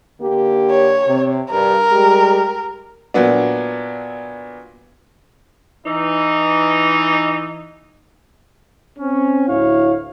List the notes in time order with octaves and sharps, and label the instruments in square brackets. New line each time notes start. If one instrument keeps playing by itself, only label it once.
[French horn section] D3 A#3 G4
[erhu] C#5
[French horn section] C3
[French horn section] G2 [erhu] A#4
[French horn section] G3 G#3 G4
[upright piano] A#2 F#3 B3 D4
[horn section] E3 D#4
[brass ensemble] C4 C#4
D2 A2 E4 C#5 F5